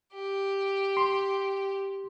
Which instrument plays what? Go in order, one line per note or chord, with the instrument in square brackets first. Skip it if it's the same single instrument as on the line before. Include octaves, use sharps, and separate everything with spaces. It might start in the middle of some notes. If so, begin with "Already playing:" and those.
[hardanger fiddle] G4
[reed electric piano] C6